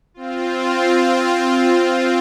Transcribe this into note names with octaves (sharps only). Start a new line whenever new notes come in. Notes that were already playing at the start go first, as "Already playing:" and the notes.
C4 F4